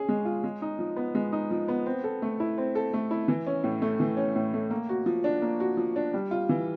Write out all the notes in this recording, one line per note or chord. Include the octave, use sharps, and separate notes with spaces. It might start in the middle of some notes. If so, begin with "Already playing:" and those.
Already playing: C#4 G#4
G#3
F4
G#3
D#4
F3
B3
G#3
D#4
F3
B3
C4
A4
A3
E4
C4
A4
A3
E4
E3
C#4
A2
A3
E3
C#4
A2
A3
A#3
F#4
F3
D4
A#3
F#4
F3
D4
G3
F4
E3